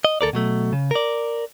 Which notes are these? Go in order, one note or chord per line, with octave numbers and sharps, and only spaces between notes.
D#5
D2 A4 A#4 D5
B2 F#3 A3
C#3
A#4 D5